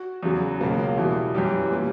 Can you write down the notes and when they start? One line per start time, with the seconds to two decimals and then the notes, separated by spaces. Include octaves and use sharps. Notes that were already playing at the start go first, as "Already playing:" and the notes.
Already playing: F#4
0.23 E2 C#3 F#3
0.60 C#2 B2 F#3 A#3
0.79 A#3
0.97 E2 B2 G3 E4
1.34 F#2 E3 G3 G4
1.71 A#2 G3 B3